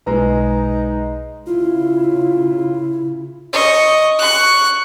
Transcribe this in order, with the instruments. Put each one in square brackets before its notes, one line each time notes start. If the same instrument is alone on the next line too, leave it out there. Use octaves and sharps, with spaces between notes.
[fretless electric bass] B1 [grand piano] G#3 A#5 [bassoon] D#4 [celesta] B4
[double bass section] C#3 [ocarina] E4 [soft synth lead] F4
[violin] D#5 C#6
C#6 F#6